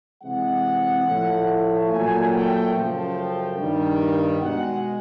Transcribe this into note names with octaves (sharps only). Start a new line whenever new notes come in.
C3 E3 G#3 F#5
A2 F3 A3
A#2 F#3 A3 G#5
G5
F#2 C#3 F3 A3 G5
G2 D#3 G3
B2 G#3 F#5